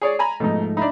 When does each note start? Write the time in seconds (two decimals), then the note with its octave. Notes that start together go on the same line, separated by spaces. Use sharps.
0.02 G#4 C#5 D5
0.19 G#5 A#5 B5
0.40 G#2 B2 F3 A3 D#4
0.77 D4 D#4 E5 B5